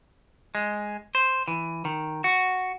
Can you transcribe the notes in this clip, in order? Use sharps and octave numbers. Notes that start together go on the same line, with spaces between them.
G#3
C5
E3
D#3
F#4